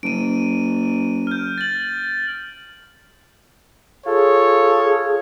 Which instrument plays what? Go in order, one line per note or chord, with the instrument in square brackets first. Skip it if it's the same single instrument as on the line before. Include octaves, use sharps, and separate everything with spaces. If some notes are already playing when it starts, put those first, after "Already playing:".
[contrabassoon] F#1 [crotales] D7 D#7
[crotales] F6 G6
A6 F#7
[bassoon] F4 [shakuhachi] G#4 [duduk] A4 [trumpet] C#5